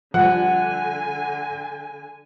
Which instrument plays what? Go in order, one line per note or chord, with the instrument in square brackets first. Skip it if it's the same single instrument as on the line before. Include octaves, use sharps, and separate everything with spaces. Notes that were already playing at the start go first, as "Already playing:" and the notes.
[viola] D3 G#5 [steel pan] F3 G3 [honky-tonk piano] F#5